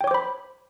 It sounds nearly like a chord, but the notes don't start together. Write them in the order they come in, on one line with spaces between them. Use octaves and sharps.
G5 C#5 D6 C5 B5